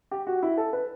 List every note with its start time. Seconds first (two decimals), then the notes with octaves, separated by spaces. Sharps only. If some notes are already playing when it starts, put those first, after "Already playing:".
0.11 G4
0.27 F#4
0.43 E4
0.58 A4
0.73 B4